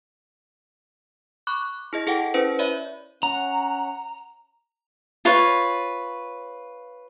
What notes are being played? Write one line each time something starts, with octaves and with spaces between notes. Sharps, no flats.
B5 C#6 D6 F#6
E4 G#4 D#5
E4 G#4 A4 F#5 G5
C#4 E4 B4 C5
C#5 D5 E5 B5
C#4 F#5 A#5
F4 B4 C#5